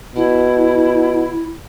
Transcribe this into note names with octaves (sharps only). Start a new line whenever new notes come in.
B2 E4